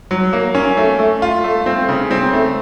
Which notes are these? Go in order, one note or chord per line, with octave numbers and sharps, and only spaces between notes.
F#3
A#3
C#4
A3
A3
F4
A3
C4
C#3
C4
A3